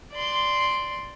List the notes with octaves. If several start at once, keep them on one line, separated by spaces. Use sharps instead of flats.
D5 C6